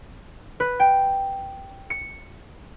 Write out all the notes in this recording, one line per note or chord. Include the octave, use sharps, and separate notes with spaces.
B4
G5
C#7